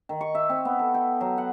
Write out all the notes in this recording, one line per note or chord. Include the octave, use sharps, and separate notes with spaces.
D#3
C#6
E5
C4
B3
A4
G5
F#3
F#5